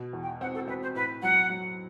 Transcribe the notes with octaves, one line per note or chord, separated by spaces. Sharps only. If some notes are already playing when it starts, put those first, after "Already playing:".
Already playing: B2
E2
G5
C4 F#5
A4
C4 B4
C5
A2 B4
F#3 F#5
F#3